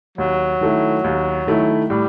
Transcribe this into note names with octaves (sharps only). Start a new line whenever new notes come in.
D#2 F#3
D#3 A3 E4
D#2
D#3 A3 E4
A2 G3